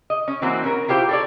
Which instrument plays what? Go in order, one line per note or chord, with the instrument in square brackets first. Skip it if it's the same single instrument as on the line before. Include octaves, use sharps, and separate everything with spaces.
[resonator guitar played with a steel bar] D#5
C#4
E3 A#3 C4 F#4
C#4 A#4
E4 F4 G4 C5
A4 C#5 D5